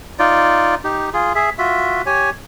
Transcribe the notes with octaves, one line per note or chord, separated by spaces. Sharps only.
D#4 F4 D5
D#4 G4
F4 G#4
G#4 E5
F4 F#4 E5
G4 C#5 G#5